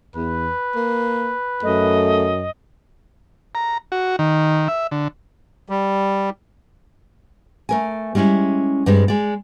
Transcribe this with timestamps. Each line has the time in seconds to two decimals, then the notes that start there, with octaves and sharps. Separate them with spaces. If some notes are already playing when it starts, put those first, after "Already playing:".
0.16 E2 B4
0.76 A#3
1.63 F#2 A3 D#5
3.55 A#5
3.92 F#4
4.19 D#3
4.68 E5
4.91 D3
5.69 G3
7.69 A3 A#4 G#5
8.15 G3 G#3 C#4 E4 G4
8.86 G2 G3 G#3 C4
9.08 G#3 D5